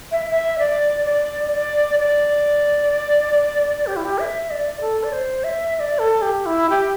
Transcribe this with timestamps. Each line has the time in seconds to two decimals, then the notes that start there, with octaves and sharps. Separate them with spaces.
0.12 E5
0.30 E5
0.59 D5
1.05 D5
1.53 D5
1.99 D5
3.87 G4
3.96 E4
4.05 G4
4.19 E5
4.50 D5
4.81 A4
5.03 D5
5.13 C5
5.44 E5
5.76 E5
5.80 D5
5.99 A4
6.22 G4
6.46 E4
6.70 G4